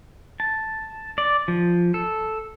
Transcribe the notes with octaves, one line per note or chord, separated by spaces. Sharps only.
A5
D5
F3
A4